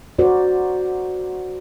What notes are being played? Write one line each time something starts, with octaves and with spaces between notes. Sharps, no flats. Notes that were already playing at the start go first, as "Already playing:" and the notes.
F#4 A#4 C5 D5